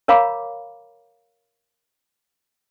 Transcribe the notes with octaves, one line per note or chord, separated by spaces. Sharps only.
A#4 C#5 F5 A#5 B5 D6